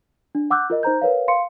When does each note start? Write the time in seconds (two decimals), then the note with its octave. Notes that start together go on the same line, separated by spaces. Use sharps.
0.35 D4
0.50 F#5 D6 E6 F#6 G6
0.70 F4 A#4 D#5
0.83 D#4 C5 A#5 G6
1.02 A#4 B4 C#5 F5
1.28 F5 C6 C#7